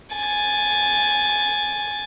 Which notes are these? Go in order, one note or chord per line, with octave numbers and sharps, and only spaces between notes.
G#5 A6